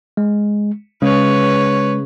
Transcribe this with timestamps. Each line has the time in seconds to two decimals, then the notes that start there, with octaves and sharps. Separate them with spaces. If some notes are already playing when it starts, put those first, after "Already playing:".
0.17 G#3
1.02 C#3 G#3 B4 C#5